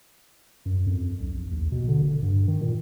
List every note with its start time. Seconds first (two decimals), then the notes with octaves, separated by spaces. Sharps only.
0.66 F#2
0.87 F2
1.20 B1
1.34 A#1
1.51 D#2
1.72 B2
1.88 D3
2.02 E1
2.23 G2
2.48 D#3
2.61 A#2